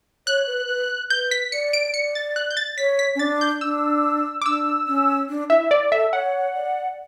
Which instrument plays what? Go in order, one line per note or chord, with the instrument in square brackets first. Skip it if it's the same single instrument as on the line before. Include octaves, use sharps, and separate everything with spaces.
[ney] C#5 [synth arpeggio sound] F#6
[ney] B4
B4
[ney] B4 [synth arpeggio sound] G6
[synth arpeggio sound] B6
[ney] D5 [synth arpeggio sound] C#7
[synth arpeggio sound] D7
[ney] D5 [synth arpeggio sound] C#7
[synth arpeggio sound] A6
F#6
G6
A6
[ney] C#5 [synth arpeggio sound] B6
[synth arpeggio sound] B6
[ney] C#4
[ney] D4 [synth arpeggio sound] A6
[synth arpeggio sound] G6
[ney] D4 [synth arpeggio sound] E6
[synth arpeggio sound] D6
[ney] D4 [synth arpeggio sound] E6
[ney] C#4
D4
[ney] E4 [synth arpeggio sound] E5
[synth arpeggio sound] D5
[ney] A4 [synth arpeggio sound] E5
[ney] C#5 [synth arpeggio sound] F#5
[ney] D5